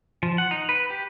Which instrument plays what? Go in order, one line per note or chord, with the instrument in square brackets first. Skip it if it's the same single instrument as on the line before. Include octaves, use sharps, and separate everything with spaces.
[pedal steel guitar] F3
F#5
D#4
B4
G4